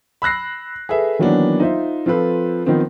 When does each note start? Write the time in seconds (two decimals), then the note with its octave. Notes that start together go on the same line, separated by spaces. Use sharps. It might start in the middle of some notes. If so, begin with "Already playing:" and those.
0.22 B5 E6 F#6 A#6 C7
0.89 G#4 A4 B4 E5
1.19 D#3 E3 F#3 A#3 B3 D4
1.60 D#4 F4 C5 E5
2.06 F3 C4 F4 A4 B4
2.66 D#3 F3 B3 C4